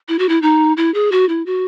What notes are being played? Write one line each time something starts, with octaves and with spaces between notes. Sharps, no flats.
E4
F#4
E4
D#4
E4
G#4
F#4
E4
F#4